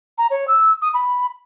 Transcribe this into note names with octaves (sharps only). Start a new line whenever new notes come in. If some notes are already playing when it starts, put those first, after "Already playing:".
A#5
C#5
E6
D#6
B5